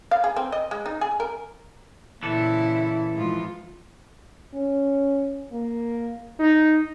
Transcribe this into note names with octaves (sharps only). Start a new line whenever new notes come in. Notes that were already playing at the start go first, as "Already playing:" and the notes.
F5
G#4
C4
D#5
G#3
D#4
G#4
A#4
A#2 C#3 E3 E4 A4
G#2 F3 F4
C#4
A#3
D#4